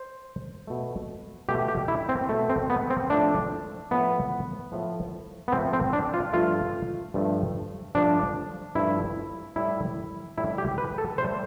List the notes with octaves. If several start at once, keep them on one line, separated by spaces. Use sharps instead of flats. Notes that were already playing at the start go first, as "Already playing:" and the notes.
Already playing: C5
B2 A3
B2 A3 G4
G4
E4
C4
B2 A3
C4
B3
C4
A2 F3 A3 D4
A2 F3 A3 B3
A2 F3 A3
B3
A2 F3 A3 C4
C4
D4
F4
G2 F3 A3 F4
G2 F3 A3
G2 F3 A3 D4
G2 F3 A3 E4
A2 G3 E4
A2 G3 E4
G4
B4
A4
A2 G3 C5